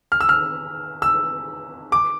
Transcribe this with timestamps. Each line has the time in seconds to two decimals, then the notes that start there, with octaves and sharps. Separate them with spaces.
0.12 F6
0.21 E6
0.29 F6
1.02 E6
1.92 D6